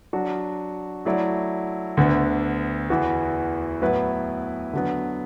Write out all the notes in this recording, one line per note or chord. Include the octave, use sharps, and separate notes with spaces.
F#3 D4 F#4
F#3 A3 E4 D5
D2 D3 B3
E2 E3 B3 F#4
A2 F#3 B3 E4 B4
D3 F#3 B3